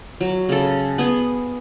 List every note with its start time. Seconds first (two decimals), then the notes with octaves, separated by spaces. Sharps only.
0.21 F#3
0.49 C#3 A4
0.98 B3 G#4